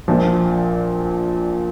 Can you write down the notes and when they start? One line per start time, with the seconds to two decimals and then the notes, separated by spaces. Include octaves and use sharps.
0.08 A#1 A#2 F3